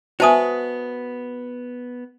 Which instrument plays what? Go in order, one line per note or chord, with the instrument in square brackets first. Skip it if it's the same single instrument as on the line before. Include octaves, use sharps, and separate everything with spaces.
[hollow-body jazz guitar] B3 F#4 [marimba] B4 E5 G#5 [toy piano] C5 A5 D#6